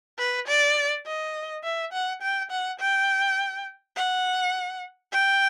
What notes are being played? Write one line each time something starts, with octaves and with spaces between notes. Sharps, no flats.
B4
D5
D#5
E5
F#5
G5
F#5
G5
F#5
G5